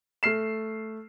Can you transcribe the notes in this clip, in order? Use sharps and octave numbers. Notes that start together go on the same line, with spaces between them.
A3 F6 C7 E7